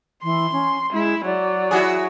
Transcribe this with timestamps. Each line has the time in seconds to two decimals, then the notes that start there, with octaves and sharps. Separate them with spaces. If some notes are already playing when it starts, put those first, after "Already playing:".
0.23 E3 C6
0.52 C#4
0.93 G#3 E4
1.25 F#3 D5
1.71 E4 F#4 G#4